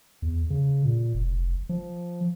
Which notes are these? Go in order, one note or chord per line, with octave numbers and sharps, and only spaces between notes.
E2
C#3
A#2
F1
F3